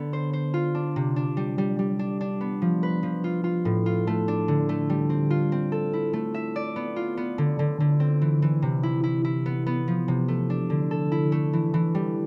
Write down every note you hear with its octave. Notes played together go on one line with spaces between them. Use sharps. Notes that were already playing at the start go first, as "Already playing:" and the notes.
Already playing: D3 B3
C5
C5
F4
D4
C3
D4
G3
G3
G3
D4
D4
B3
F3
B4
F3
F4
F4
A2
F4
A3
D4
D3
A3
G3
C4
F4
C4
A4
E4
A3
E5
D5
B3
F4
B3
D3
D3
D3
C4
E3
E3
C3
E4
E4
E4
B3
B3
F3
C3
A3
D4
D3
A4
E4
A3
E3
E3
G3